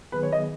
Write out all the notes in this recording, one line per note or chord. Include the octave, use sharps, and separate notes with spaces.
D#3 F#3 B3 G#4 B4
C#5
D#5